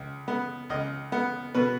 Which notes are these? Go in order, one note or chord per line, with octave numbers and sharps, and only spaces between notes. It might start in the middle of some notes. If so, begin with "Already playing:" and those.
Already playing: C#2
B3
C#2 D#5
B3
B2 B4